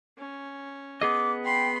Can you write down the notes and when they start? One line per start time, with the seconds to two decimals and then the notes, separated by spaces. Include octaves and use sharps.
0.18 C#4
1.01 B3 G#4 D#5 D6
1.45 G5 B5 C6